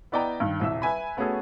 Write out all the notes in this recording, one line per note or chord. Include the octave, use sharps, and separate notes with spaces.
B3 E4 D5 D#5 G5 A#5
G2 D#3
D#1 C2 E5 E6
B4 E5 G#5 B5
A3 B3 C#4 F#4 G#4 A4